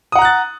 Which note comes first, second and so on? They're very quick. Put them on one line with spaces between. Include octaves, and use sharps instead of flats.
D#6 F#5 A#5 F#6 A6